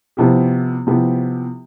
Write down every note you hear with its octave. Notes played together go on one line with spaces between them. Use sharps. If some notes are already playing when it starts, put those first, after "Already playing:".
C3 F3 B3 E4 G4
C3 F3 B3 E4 G4